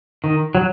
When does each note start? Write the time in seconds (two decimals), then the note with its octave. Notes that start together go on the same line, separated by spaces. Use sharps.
0.24 D#3
0.55 F#3